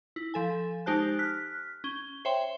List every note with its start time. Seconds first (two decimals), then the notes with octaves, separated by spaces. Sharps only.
0.16 E4
0.34 F3 A4 G#5
0.86 G#3 D#4 G4 C5 A5 F#6
1.19 F6 F#6 B6
1.84 C#4 G7
2.25 C5 C#5 E5 G5 C6